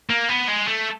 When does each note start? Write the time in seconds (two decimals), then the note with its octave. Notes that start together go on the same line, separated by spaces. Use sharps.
0.10 A#3
0.29 B3
0.48 G#3
0.68 A3